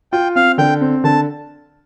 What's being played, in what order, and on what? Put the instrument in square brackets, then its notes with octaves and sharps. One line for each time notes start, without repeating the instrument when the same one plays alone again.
[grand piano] F4 [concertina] G5
[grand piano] C4 [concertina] F5
[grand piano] D3 [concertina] G5
[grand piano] C4
[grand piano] D3 [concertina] A5